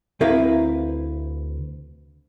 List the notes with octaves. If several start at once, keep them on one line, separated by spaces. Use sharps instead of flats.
D2 C4 E4 A#4 B4 F5